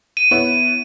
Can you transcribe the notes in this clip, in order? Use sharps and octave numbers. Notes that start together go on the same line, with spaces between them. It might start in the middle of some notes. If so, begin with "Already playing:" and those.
D#7
B3 E4 C#5